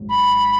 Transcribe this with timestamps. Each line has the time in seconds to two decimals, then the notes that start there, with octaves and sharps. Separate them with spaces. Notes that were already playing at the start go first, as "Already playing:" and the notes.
Already playing: G#1 G#2 F#3
0.09 B5